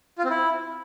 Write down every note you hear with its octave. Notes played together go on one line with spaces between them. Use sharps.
F4
C4
E4